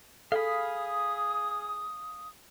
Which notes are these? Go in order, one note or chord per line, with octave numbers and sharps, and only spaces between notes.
G#4 A4 F5 B5 D#6